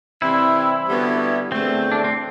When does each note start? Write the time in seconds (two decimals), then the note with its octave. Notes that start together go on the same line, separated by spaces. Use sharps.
0.22 C3 E3 G3 C4 E4
0.87 D3 G3 B3 F#4
1.52 E2 D3 A3 C4
1.92 D4
2.04 C4